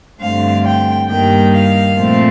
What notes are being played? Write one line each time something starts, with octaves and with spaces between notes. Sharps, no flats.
G2 D3 A3 C4 F5
G5
G2 D#3 G3 A#3 G5
F5
A#2 F3 A3 C4